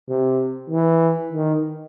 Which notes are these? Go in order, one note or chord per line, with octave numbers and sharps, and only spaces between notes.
C3
E3
D#3